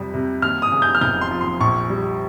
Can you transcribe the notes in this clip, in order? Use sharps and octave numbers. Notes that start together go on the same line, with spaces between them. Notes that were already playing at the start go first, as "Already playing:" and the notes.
Already playing: F2 C3 G3
C3
D#2 F6
D#6
C#3
G6
F6
F1 G6
C6
F3
C6
A#1 C#6
G3